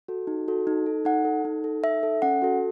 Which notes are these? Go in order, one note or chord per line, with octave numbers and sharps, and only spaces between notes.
F#4 A4
D#4
F#4 A4
D#4
A4
D#4 F#5
A4
D#4
A4
D#4 E5
A4
C#4 F#5
F#4 A4